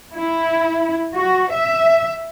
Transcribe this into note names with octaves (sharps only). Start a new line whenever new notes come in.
E4
F#4
E5